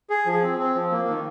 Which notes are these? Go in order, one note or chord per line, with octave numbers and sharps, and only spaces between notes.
G#4
F3
C4
C4
F3
A#3
D#3